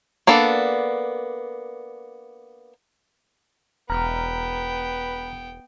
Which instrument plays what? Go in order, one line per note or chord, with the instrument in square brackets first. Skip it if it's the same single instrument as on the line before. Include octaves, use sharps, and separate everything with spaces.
[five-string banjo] A#3 B3 D4 A4
[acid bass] E1 [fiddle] B3 G5 [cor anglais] B4 [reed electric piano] A#5 F6